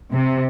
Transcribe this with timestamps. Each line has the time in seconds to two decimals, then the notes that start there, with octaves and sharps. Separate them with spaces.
0.13 C3